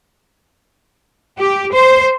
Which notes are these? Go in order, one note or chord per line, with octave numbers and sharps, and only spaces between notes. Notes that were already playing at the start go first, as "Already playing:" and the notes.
G4
C5